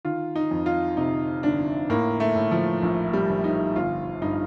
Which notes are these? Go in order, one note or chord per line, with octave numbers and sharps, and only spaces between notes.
D#3 F4
D#4
F2
F4
C3 D#4
G1 D4
A2 A#3
A3
A2
F3
A#1
G3
A#1
D#4
G1 F4
G2 D#4